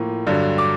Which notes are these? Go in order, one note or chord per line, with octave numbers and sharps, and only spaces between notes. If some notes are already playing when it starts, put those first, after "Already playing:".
Already playing: A2 F3 A#3
G2 D3 F#3
D6